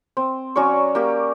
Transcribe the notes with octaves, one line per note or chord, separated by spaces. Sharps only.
C4
F#3 C#4 D5 C#6
A#3 G4